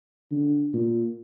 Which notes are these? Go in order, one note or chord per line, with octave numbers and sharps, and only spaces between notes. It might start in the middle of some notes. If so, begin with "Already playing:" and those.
D3
A#2